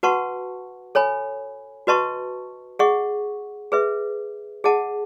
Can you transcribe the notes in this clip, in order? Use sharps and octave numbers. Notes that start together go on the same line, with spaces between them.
F#4 B4 F#5 A5 C#6
A4 C#5 G#5 B5
F#4 B4 D#5 A5 C#6
G#4 D#5 F#5 C#6
G#4 B4 E5
G#4 D#5 F#5 A5